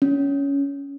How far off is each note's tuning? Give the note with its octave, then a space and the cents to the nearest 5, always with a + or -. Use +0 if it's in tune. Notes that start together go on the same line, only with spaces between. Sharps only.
C#4 +15